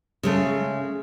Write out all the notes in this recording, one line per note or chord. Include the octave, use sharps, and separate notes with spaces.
C#3 G#3 A3